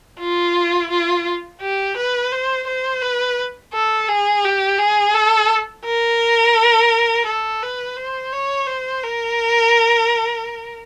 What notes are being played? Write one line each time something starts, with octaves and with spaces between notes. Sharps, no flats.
F4
F4
G4
B4
C5
C5
B4
A4
G#4
G4
G#4
A4
A#4
A4
B4
C5
C#5
C5
A#4